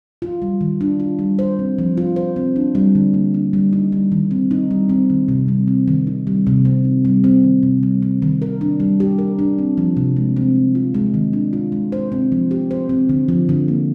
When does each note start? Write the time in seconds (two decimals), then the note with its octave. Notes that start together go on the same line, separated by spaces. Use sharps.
0.22 F4
0.42 G3
0.61 D#3
0.81 D4
1.00 F4
1.19 G3
1.39 C5
1.59 C4
1.78 F3
1.97 F4
2.16 C5
2.36 C4
2.56 D4
2.75 G3
2.95 D3
3.14 A#3
3.34 D4
3.53 G3
3.73 D#4
3.92 G3
4.12 D#3
4.31 C4
4.51 D#4
4.71 G3
4.89 C4
5.10 D#3
5.28 C3
5.48 G3
5.67 C4
5.88 D#3
6.07 D#4
6.27 G3
6.47 C3
6.65 C4
6.84 D#4
7.05 G3
7.24 C4
7.44 D#3
7.63 C3
7.83 G3
8.02 C4
8.22 D#3
8.42 A#4
8.61 D4
8.80 G3
9.00 G4
9.19 A#4
9.39 D4
9.58 C4
9.77 F3
9.97 C3
10.16 G#3
10.36 C4
10.56 F3
10.75 F4
10.94 G#3
11.14 D#3
11.33 D4
11.53 F4
11.72 G#3
11.92 C5
12.12 C4
12.32 F3
12.51 G4
12.71 C5
12.89 C4
13.09 D3
13.28 F3
13.49 D3
13.68 A#3